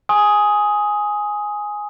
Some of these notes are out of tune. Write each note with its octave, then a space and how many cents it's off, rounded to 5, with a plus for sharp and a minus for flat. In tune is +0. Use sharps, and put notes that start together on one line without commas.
G#5 +0 C6 +25 D#6 +10